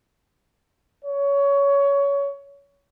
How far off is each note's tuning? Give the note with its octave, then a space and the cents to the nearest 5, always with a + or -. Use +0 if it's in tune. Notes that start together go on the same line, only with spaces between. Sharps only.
C#5 +20